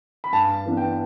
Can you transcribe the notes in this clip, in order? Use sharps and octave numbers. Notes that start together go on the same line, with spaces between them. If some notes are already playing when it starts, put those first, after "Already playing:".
B5
G2 A5
E3 B3 D4
G5